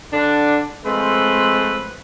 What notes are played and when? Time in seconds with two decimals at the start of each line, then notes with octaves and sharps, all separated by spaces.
0.12 D3 D4
0.86 F3 G#3 A3 C4 B4